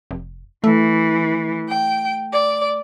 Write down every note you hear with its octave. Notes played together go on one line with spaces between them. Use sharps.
F1
E3 A3
G5
D5